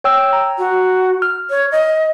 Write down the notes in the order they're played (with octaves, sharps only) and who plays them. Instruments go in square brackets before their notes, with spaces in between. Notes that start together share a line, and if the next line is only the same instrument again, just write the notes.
[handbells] C#5 G5 E6
A#5
[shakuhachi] F#4
[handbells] F6
[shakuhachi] C#5
D#5